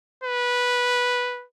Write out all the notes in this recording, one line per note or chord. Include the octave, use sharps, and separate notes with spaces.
B4